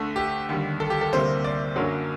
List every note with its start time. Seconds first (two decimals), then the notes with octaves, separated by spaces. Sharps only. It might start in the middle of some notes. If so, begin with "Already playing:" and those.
Already playing: D2 D3 A3
0.16 G4
0.49 D#2 D3 G3
0.80 A4
0.90 G4
1.01 A4
1.13 D2 C3 G3 A#3 C5
1.44 D5
1.76 F#2 D3 F#3 A#3